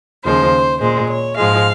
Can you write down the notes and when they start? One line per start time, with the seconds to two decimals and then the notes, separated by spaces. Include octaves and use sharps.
0.25 D#2 C#3 F3 G#3 C5
0.81 A#2 G#3 C5
1.10 C#5
1.37 G#2 F3 G#3 F5